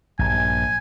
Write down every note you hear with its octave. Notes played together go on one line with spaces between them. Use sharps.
A#1 G2 G#5